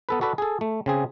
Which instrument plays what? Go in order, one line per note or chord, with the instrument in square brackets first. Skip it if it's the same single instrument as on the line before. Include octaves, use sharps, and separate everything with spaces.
[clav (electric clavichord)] B3 A4 B4
F#4 A4 B4 D5
G#4 A4
A3
C#3 C4 G#4